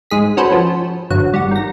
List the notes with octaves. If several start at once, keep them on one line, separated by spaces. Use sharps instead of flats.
G#2 G#4 B6
C#4 F#4 A4 B4 C5
F3
G1 F#3 F#5
G3 F#4
D#3 A#6